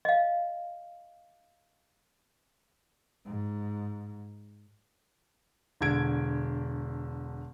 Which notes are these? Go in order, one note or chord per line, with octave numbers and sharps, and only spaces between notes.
D#5 F5
G#2
E1 D3 G#6 D7